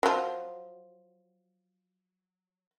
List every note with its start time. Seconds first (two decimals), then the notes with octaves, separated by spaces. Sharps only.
0.03 F3 F#3